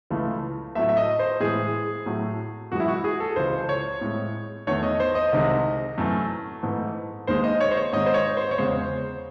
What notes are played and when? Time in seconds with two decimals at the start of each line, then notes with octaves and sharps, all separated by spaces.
0.10 C#2 C#3 E3 A3
0.75 A2 F#3 A3 E5
0.89 E5
0.97 D#5
1.19 C5
1.40 A2 E3 G#3 G#4
2.06 A2 F#3 A3
2.71 F#2 E3 G#3 F#4
2.80 E4
2.88 F#4
3.04 G#4
3.20 A4
3.36 C#2 C#3 E3 C5
3.69 C#5
4.01 A2 G#3
4.67 E2 D#3 A3 C#5
4.83 D#5
5.00 C5
5.15 D#5
5.32 C2 C3 D#3 G#3
5.98 F#2 E3 A3
6.63 G#2 E3 A3
7.27 D#2 D#3 G#3 C5
7.44 D#5
7.60 C#5
7.71 C5
7.77 C#5
7.93 G#2 D#3 G#3 D#5
8.06 C5
8.14 C#5
8.37 C5
8.51 C#5
8.58 E2 C#3 G#3 C5